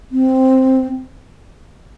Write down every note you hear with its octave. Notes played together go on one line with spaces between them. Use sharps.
C4